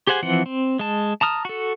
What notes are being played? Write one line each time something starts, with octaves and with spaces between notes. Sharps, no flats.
G4 G#4 C5 F#5 G#5
E3 F3 C4 F#5
C4
G#3 A5
A5 A#5 D#6 F6
F#4 A4